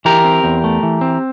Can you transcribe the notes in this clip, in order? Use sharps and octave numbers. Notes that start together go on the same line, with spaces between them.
E3 G4 A#4
C4
E2
A3
E3
C4